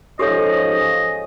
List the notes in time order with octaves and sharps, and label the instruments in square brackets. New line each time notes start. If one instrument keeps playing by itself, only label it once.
[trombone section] G#2 F3 C#4 [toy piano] G4 A4 C#5 [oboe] D#5